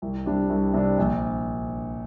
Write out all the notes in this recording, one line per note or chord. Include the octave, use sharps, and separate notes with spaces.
C2
C3 G3 D4
C2
C3 G3 D4
A#1